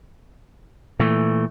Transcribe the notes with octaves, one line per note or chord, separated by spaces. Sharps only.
A#2 E3 A3